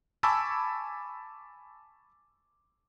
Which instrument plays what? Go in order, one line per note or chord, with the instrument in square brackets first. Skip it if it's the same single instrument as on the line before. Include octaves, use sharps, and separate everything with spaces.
[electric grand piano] G#5 A5 B5 C#6 D6 E6